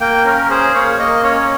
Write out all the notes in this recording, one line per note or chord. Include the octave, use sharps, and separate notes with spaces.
A#3 G5
C#4 A#4
G#4 C5
A#3 C#5
A#3 D#5
C#4 C#5